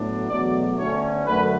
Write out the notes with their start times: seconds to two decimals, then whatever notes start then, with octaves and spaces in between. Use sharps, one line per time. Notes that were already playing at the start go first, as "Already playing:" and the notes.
Already playing: A2 F#3 B3 D4
0.29 E2 B2 F#3 A3 D5
0.78 D2 D3 A3 C#4 C#5
1.27 F#2 D3 A3 B4